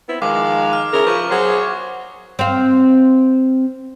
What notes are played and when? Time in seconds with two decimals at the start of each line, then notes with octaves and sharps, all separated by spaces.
0.09 B3 C4 E4
0.22 D#3 F3 G#3 F5 D6
0.73 F6
0.93 C#3 E4 G#4 A#4
1.07 F3 B4 C#6
1.31 F#3 G#4 C5
2.39 C4 F5